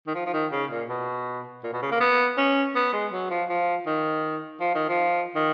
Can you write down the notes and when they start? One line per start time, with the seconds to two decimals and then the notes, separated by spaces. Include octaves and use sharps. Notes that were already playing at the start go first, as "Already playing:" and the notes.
0.07 D#3
0.15 F3
0.26 F3
0.33 D#3
0.52 C#3
0.70 A#2
0.89 B2
1.63 A#2
1.73 B2
1.82 C#3
1.91 A#3
2.00 B3
2.37 C#4
2.75 B3
2.93 G#3
3.12 F#3
3.30 F3
3.49 F3
3.86 D#3
4.60 F3
4.75 D#3
4.89 F3
5.35 D#3